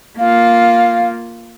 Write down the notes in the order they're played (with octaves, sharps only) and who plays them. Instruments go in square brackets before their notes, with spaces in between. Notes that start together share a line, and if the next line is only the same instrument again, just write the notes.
[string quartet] A#3 F4 [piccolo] F5